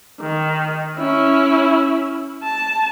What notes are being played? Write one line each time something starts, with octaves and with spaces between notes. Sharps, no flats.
D#3
C#4 E4
A5